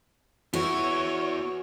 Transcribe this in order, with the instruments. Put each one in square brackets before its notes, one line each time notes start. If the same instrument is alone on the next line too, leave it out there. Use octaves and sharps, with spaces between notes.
[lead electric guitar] B3 E4 [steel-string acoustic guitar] F#4 [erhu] C#5